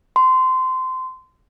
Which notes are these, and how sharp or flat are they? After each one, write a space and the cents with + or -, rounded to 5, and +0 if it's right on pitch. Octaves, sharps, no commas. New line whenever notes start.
C6 -20